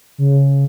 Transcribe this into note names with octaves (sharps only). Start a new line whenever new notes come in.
C#3